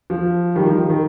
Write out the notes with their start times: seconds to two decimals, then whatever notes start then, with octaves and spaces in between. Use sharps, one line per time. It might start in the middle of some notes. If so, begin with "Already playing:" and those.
0.10 F3
0.55 D#3 G3
0.66 F3
0.79 D#3
0.90 D#3